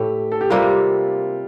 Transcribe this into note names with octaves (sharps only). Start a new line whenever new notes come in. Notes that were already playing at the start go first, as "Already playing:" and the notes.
Already playing: A2 A3 G4
A4
G4
C3 G3 A#3 F4